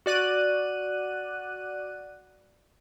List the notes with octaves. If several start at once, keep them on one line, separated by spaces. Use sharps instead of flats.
F#4 D5 F#6 D#7